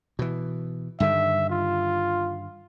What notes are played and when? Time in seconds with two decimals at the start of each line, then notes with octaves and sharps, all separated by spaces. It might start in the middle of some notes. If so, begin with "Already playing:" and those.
0.19 B2 E3
1.00 G2 D3 D#3 E5
1.50 F4